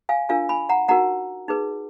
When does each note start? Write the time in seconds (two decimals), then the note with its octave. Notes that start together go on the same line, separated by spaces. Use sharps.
0.09 F5 G#5
0.29 D4 F4 A#4 F5 G#5
0.49 G#5 B5
0.69 F#5 A#5
0.88 D#4 F#4 A#4 F#5 A#5
1.48 D#4 G#4 B4